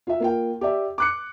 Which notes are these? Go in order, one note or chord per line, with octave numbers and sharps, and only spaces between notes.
F4 E5
A#3 F4 G5
G4 D5 E5
D6 F#6 C#7